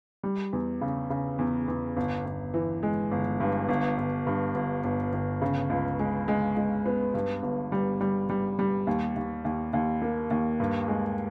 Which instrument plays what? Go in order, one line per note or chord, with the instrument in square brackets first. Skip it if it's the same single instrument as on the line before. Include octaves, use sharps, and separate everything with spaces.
[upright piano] G3
E2
C#3
C#3
E2
E2
G1
G1
E3
G#3
G1
G2
G1
G1
G2
G1
G1
G1
C#3
C#2
G#3
G#3
G#3
B3
G2
G1
G3
G3
G3
G3
D#2
D#2
D#2
D#2
A#3
D#2
G2
G#3